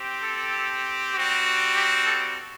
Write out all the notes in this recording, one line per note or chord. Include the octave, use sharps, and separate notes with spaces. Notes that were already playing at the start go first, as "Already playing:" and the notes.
Already playing: C4 G4
A4
G3 C4 F#4
G4
A4